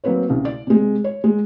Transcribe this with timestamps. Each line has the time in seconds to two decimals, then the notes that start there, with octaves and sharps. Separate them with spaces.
0.04 F#3 A#3 C4 B4 C#5
0.29 C2 C#3
0.45 D5
0.67 C3 G#3
1.04 C#5
1.24 G#3